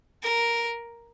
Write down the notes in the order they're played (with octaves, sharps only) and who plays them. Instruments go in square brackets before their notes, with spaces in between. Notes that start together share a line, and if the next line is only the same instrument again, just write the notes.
[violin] A#4